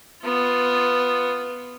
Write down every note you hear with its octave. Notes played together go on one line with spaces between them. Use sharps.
B3 F4